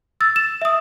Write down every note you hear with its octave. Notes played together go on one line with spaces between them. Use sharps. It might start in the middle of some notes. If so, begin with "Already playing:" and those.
E6 A6
E7
E5 D#6